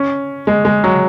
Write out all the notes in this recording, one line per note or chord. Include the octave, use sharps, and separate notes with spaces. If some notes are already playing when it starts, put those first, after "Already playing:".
Already playing: C#4
G#3
G#3
F#3